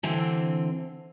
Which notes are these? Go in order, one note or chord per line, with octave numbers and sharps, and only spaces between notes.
D3 E3 C4